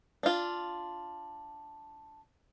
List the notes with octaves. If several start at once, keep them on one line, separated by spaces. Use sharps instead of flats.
D4 F4